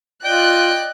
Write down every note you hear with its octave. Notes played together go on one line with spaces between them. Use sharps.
F4 D5 D#5 G5 F#6